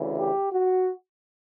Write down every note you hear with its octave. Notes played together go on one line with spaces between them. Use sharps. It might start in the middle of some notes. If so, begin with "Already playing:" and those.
Already playing: D2 C#3 E3
G4
F#4